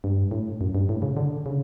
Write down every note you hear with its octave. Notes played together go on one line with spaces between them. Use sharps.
G2
A2
F#2
G2
A2
C#3
D3
C#3